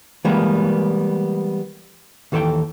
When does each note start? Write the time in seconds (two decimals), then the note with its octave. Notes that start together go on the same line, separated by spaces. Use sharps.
0.25 E3 G3 G#3 A#3 B3
2.32 D#2 E3 A4 B4 G5